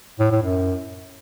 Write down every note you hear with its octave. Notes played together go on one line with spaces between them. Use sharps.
A2
A2
F#2